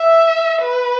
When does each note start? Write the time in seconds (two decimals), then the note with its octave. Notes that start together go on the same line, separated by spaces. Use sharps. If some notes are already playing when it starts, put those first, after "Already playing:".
Already playing: E5
0.61 B4